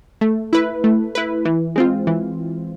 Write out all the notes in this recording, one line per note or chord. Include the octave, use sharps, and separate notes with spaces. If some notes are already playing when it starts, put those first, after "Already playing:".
A3
E4 B4
A3
E4 B4
E3
G#3 C4 F4
E3